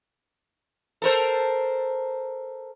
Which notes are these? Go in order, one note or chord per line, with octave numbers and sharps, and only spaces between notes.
A4 A#4 C5